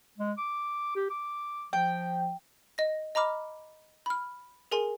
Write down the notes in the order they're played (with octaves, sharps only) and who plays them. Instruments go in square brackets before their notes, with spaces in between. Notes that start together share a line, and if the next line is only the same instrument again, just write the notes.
[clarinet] G#3
D6
G4
D6
[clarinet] F3 [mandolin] G5
[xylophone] D#5 A#6
D#5 A#5 B5 D6 F6
B5 F6
G#4 A#4 G#5 C6